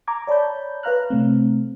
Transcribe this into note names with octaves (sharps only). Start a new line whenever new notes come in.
A#5 D6 G#6
C#5 D5 A5 B5 G6
B4 C#5 F5 A#5 F6 F#6
C3 A3 C4